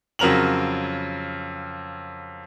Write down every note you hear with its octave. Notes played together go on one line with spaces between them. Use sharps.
F2 C#3 F#3 A#4 F7 F#7